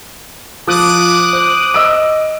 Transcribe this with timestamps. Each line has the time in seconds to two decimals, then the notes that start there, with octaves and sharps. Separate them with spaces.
0.67 F3 D6 D#6 F#6
1.33 C5
1.74 D#5 E6 D7